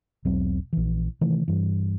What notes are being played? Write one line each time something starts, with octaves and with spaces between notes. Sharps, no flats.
E1 B1 F#3 C4
A#1 E3
C3 D#3 E3 A3
G2 E3